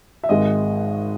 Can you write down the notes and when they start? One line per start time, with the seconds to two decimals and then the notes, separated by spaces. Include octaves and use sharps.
0.24 E5
0.29 G#1 G#2 D#3 G#3 D#5